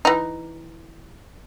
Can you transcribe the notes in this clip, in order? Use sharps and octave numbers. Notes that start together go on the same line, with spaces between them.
E3 D#4